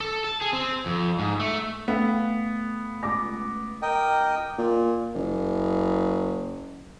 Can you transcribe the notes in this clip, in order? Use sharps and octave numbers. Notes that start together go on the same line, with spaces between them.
A4
A5
G#4
C4
F2
G#2
A3
A3 B3 F5 G5
C#2 D6 A#6
A#4 D#5 G5
A#2
F#1